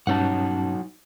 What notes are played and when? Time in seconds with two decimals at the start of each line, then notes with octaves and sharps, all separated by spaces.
0.07 G2 F#3 C#4 D#4 F#5 A5